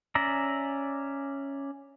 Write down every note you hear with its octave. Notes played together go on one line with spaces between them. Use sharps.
C#4 D5 E5 A#5